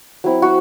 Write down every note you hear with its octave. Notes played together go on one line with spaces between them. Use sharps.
F#3 C4 E4
F#4